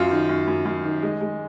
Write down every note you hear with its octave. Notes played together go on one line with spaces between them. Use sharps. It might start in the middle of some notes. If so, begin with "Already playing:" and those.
Already playing: F#2 F4
D#3
F#2
F#2
F#2
D#3
G#3
G#3